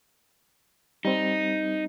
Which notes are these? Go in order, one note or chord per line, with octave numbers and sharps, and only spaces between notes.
G3 C4 D#4